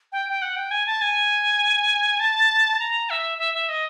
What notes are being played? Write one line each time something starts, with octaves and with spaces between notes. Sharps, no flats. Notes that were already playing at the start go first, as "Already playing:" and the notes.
G5
G5
F#5
G5
G#5
A5
G#5
A5
A#5
E5
E5
E5
D#5